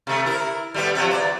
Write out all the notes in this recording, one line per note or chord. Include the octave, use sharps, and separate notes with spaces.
C3 A3
E4 A#4
G3 A3 B3
F3 F#3 C4
E2 D5